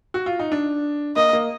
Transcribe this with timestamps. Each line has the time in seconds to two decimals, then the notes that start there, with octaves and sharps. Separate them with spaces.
0.14 F#4
0.26 F4
0.39 D#4
0.52 D4
1.16 A#3 D#5
1.33 A#3